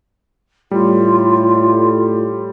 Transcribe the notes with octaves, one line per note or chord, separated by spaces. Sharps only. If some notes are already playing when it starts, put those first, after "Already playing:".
A2 G3 F4